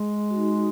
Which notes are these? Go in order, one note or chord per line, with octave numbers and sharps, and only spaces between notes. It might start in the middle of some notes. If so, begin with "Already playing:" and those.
Already playing: G#3 G#4
F#4
D#4